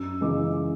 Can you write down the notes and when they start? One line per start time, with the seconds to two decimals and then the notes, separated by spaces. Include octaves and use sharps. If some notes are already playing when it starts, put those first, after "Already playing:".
Already playing: F#2 E6
0.21 C#3 E3 G#3 D6